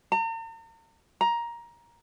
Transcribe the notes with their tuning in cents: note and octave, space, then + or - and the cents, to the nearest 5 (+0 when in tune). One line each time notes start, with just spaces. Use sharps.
A#5 -45
A#5 +15